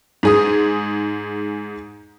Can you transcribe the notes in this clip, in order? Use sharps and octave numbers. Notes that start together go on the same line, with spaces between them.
G#2 G#4 D#6